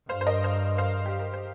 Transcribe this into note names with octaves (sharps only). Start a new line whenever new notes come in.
G2 C5 F5
C5
A#4 D#5
C5 F5
C5 F5
G4
A#4
C5